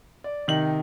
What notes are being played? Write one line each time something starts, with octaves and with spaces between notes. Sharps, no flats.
D5
C3 D#3 D#4 F#7